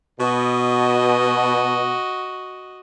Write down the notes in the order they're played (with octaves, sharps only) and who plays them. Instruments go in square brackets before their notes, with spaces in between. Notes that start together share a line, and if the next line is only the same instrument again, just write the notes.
[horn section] B2 [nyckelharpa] F#4 D#5